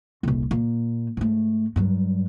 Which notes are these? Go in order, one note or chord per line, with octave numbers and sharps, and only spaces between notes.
D#1 C2
A#2
G#2 A3
G2 F#3